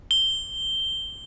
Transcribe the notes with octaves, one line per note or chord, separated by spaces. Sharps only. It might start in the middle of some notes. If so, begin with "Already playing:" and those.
G7